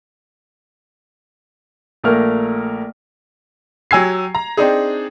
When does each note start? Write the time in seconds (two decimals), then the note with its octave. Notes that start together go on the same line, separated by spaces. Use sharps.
2.04 A#1 A3 A#3 A#4 F6
3.91 F#3 G4 G#5 E6 G#6 C7
4.35 A#5
4.57 C4 D4 D#4 G#4